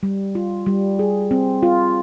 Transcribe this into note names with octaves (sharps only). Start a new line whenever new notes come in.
G3
F4
G3
G#4
C4
F4